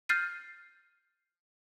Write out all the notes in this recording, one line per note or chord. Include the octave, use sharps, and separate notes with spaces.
F6 G6 A6 C7 D#7